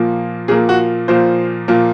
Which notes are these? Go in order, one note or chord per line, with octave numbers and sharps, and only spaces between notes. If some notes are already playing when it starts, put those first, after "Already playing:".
Already playing: A#2 F3 A#3
A#2 F3 A#3 G#4
F#4
A#2 F3 A#3 C5
A#2 F3 A#3